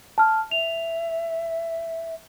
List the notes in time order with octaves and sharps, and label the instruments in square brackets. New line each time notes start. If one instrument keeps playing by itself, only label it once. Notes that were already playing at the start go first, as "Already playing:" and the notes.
[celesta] A5 F6
[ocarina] E5 [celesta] F7